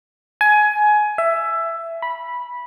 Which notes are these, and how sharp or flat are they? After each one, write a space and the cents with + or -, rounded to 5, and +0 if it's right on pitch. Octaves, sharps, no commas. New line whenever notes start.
G#5 +20
E5 +15
B5 -10